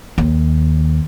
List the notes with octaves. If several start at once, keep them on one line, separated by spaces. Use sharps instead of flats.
D#2